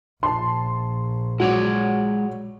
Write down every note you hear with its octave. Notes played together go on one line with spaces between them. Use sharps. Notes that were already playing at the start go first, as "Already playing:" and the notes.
A#1 A5 C6
F#3 G#3 F#4 C#5 D5